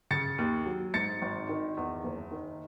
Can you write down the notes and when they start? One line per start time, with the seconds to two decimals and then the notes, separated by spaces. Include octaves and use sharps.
0.11 C#3 A6 C#7
0.38 D#2
0.66 F#3
0.94 G#2 A6 C#7
1.22 G#1
1.49 D#3
1.77 E2
2.04 F#1
2.32 D#3